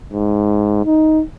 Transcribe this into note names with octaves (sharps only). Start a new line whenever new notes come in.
G#2
D#4